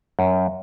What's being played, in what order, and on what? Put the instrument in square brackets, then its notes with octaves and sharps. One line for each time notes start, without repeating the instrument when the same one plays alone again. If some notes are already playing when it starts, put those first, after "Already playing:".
[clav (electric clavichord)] F#2